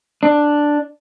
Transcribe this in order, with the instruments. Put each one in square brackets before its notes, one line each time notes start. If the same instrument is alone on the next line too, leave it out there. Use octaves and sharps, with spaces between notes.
[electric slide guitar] D4